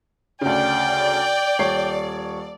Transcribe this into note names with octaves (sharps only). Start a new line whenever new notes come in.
D2 C#3 D5 G5
D#1 C#5 C7